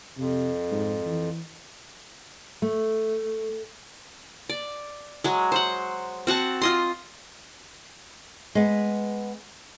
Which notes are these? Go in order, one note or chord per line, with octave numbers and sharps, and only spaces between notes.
F2 C3
G#2
E3
A3
D5
F#3 G#3
C5 F#5
C4 F#4 F#5 A5
F4 D#5 C6
G#3 B3